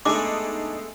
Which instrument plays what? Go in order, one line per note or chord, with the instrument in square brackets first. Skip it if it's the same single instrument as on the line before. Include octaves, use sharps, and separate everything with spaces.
[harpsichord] G#3 A3 B3 [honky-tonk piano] D4 D#4 G#4 [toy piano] D6